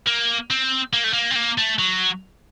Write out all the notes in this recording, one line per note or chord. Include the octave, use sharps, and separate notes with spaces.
A#3
C4
A#3
A3
A#3
C4
A#3
A3
F#3